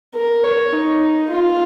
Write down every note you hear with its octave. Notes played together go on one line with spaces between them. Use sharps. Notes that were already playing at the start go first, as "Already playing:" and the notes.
A#4
C#5
D#4
F4